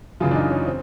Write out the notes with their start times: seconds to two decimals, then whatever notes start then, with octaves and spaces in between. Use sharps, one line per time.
0.20 F#2 C#3 E3 F4
0.31 D4
0.35 D#4
0.51 C#4
0.67 C4